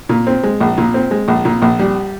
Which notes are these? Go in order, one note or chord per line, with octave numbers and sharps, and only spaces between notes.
A#2
C4
G#3
A#1
A#2
C4
G#3
A#1
A#2
A#1
G3